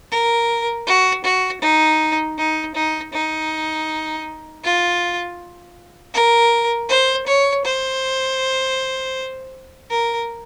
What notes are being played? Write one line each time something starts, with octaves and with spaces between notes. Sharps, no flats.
A#4
F#4
F#4
D#4
D#4
D#4
D#4
F4
A#4
C5
C#5
C5
A#4